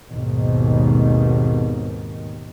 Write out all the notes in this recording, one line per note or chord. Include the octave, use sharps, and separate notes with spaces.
G#1 D#2 G#2 B2 D#3